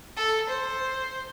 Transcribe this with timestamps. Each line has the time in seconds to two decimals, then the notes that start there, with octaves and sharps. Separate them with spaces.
0.17 A4
0.49 C5